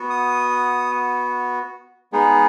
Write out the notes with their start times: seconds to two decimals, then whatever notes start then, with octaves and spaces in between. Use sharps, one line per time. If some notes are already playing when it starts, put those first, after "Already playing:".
Already playing: B3 F#4
0.10 D#6
2.12 G#3 B3 D#4 G#4